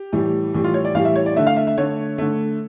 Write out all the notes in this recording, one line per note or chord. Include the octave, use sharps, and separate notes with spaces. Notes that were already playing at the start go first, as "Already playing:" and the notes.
Already playing: G4
A2 E3 G3
A2 E3 G3
F4
C#5
D5
A2 E3 G3 F5
E5
C#5
D5
D3 A3 E5
F5
E5
E5
D3 A3 C#5
D3 A3